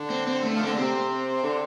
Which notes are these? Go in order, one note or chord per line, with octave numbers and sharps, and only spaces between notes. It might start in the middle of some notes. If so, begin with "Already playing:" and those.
Already playing: D3
C4
C4
A3
F3
D3 C4
A3
C3 C4
D3